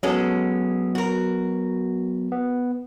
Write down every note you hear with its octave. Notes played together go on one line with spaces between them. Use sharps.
F#3 G#3 B3 C#4 A4
F#4 A#4
B3